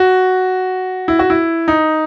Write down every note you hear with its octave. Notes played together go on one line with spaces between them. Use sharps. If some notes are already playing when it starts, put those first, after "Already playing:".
Already playing: F#4
E4
F#4
E4
D#4